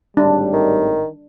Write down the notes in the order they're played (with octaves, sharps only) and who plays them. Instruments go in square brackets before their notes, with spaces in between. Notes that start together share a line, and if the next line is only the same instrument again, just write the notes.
[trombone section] G#1 A2 G3 [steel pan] D4
[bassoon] D#3